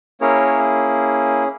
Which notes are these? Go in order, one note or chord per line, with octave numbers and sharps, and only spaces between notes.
A#3 C#4 E4 G#4 A#4 C#5